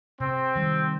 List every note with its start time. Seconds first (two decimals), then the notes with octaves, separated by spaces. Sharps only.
0.20 C3 C4
0.56 D#3 G3